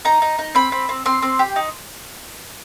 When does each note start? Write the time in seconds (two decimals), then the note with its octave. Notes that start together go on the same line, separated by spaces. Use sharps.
0.05 D#4 A#5
0.22 D#4
0.39 D#4
0.55 C4 B5
0.72 C4
0.89 C4
1.06 C4 C6
1.22 C4
1.39 G4
1.56 D#4